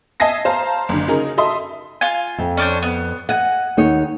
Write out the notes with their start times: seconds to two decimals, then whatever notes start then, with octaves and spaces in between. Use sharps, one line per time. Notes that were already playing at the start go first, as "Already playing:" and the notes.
0.20 D#5 E5 G#5 A5 A#6 C7
0.45 C5 F5 A5 A#5
0.89 F#1 D3
1.08 C#3 D#4 G#4 A#4
1.37 A4 D#5 E5 C6 D#6
2.01 F4 G#5
2.38 F2
2.57 C#4 D4 C5
2.83 B3
3.29 D#5 F#5 G#5
3.77 D#2 D#4 C#5